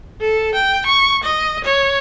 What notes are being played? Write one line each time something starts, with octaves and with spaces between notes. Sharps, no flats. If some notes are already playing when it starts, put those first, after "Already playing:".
A4
G5
C#6
D#5
C#5